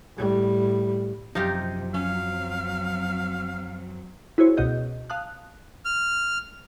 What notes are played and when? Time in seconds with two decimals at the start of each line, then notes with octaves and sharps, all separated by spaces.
0.16 A2 G3
1.35 F#2 C3 F3 D#4 F4 G4
1.94 F#3 C4 C#4 F5
4.38 E4 F#4 G#4 C5 C#5
4.57 C#2 B2 F#4 D#5 G6
5.10 F5 A5 D#6 F#6
5.85 F6